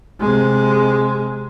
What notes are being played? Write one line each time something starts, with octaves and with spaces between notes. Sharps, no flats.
C3 G#3